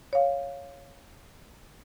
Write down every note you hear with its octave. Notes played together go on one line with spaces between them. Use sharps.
C#5 F5